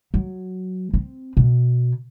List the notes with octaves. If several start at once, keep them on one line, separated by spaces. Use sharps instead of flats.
F#3
C4
B2